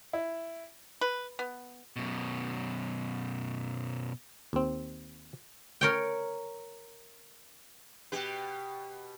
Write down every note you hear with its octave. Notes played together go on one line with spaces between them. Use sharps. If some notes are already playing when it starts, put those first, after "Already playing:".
E4
B4
B3
F#2 B2
D#2 C4
A#4 C#5 G5
B2 G4 B4